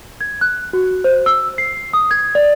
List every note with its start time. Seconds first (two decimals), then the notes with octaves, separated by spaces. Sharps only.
0.21 G#6
0.41 F#6
0.73 F#4
1.04 C5
1.26 E6
1.58 C7
1.93 D#6
2.11 G#6
2.35 D5